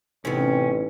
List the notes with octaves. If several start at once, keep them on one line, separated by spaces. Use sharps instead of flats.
A1 C3 B3 C#4 D#4 G4 B4